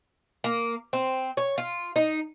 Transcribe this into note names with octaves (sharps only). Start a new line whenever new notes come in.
A#3
C4
C#5
F4
D#4